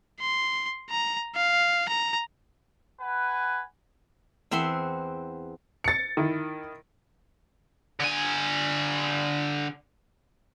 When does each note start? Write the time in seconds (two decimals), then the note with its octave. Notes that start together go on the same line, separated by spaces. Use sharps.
0.21 C6
0.90 A#5
1.35 F5
1.89 A#5
3.00 B4 F#5 G#5
4.51 E2 C4 E5 F#5 C6
5.84 A6 C#7
6.17 D#3 E4
8.00 D3 G#5